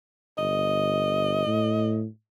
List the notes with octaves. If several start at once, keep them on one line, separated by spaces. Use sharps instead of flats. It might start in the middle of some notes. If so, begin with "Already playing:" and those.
G1 D#5
A2